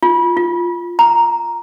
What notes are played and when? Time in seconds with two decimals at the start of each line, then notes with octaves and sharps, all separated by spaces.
0.03 F4
0.37 F4
0.99 A#5